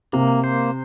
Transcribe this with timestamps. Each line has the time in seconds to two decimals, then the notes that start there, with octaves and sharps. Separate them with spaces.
0.13 C3 A#3
0.44 C5